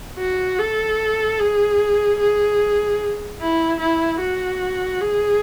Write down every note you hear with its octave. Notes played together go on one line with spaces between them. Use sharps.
F#4
A4
G#4
G#4
E4
E4
F#4
G#4